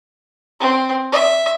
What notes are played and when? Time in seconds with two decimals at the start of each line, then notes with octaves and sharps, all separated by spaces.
0.61 C4
1.12 E5